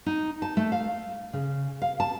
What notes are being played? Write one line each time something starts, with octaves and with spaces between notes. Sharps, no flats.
D#4
A5
A3
F5
C#3
F5
A5